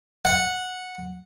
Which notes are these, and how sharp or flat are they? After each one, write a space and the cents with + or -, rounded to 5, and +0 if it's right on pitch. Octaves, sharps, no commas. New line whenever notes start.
F#5 -10